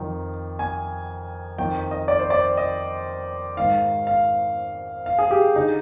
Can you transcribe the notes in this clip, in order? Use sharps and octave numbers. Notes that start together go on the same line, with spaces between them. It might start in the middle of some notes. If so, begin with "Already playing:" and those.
Already playing: F2 D#3
G#5
F2 D#3 G5
D#5
D5
C5
D5
D#5
G#2 D#3 F5
F5
F5
G#4
G4
D3 D#4